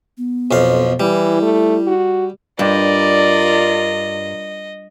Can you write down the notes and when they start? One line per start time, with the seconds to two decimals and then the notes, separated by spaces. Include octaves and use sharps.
0.18 B3
0.51 B1 F2 F5
1.00 E3 G3 E4
1.42 A3
1.87 F#4
2.59 G2 F4 A#4 D5 D#5